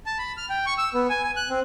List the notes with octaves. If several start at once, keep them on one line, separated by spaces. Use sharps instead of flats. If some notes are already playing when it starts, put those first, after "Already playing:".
A5
B5
F6
G5
C#6
E6
B3
G#5
G#5
F#6
C4